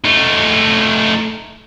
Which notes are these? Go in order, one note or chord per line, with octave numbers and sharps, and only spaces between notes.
A3 D#4